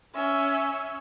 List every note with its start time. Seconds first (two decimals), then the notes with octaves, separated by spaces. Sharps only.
0.15 C#4 E5